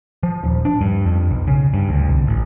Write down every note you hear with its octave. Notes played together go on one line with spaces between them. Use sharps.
F3
D#1
D4
G2
F2
B1
C#3
G2
D2
C2
A1